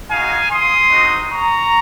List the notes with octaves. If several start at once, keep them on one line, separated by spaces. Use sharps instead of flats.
G#3 D#4 F#4 F5 G#5
C6 D#6
G#3 C4 D#4 F#4
A#5 C#6